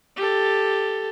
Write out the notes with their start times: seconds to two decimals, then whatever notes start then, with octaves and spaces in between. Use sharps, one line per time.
0.16 G4 A4